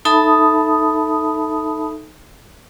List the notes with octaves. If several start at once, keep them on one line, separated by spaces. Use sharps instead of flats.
D#4 A4 E5 A5 B5 D#6